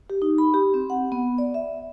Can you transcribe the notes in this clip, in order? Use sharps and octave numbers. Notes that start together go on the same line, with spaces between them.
G4
D#4
B5
G4
C4
F#5
B3
D5
E5